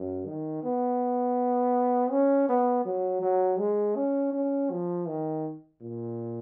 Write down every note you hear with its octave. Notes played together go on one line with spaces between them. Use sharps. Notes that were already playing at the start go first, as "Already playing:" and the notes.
Already playing: F#2
D#3
B3
C#4
B3
F#3
F#3
G#3
C#4
C#4
F3
D#3
A#2